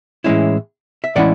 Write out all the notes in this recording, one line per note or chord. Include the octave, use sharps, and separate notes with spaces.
A2 E3 G#3 C#4 E4
E5
A2 E3 G#3 C#4 E4 D5 F#5